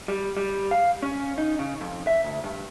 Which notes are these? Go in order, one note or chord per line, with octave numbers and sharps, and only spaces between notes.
G3
G3
F5
C#4
D#4
C#3
F2
E5
D2
G2